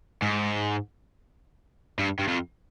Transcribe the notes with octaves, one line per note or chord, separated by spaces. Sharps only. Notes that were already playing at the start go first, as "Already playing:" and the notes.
G#2
G2
G2
F2